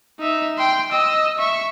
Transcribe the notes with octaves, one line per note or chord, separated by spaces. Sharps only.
D#4 E5
G5 C6
D#5 E6
E5 C#6